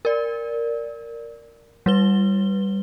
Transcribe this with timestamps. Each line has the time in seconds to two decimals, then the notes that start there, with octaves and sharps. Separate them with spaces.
0.05 A#4 D5
1.86 G3 B4 G7